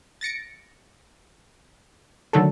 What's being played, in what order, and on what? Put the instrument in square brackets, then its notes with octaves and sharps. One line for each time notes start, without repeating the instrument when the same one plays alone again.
[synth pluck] A6 A#6 C#7 D7
D3 D#3 F#3 A3 D4 A4